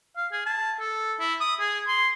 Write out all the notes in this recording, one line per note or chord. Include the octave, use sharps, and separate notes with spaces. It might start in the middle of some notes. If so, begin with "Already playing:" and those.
F5
G#4
A5
A4
E4
D#6
G#4
C6